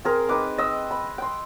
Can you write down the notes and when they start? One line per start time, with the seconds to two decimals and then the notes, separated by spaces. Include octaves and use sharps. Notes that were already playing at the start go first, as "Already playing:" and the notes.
0.05 C4 G#4 A#4
0.29 C4 D#4 B4 D6
0.58 D#5 E6
0.91 B5
1.18 G5 C6